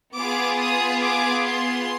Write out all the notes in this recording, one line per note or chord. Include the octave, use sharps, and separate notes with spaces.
B3 F4 G#4 D6
D#6
D6
C6